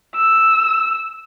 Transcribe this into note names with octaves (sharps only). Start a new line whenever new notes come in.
E6